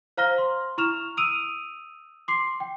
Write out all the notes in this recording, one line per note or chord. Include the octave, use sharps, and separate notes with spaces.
C5 F5 A#5 F6 A#6 G7
C6
E4 A#5 C#6 F6 E7 F7
D#6 E6 D7 D#7 F7
C6 D6 C7
G5